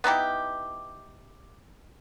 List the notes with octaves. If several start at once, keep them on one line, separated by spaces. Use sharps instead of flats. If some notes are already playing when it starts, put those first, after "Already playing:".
B3 D#4 E4 G4